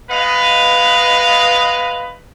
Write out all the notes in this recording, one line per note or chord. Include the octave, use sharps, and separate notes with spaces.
G#3 B3 B4 D#5 F5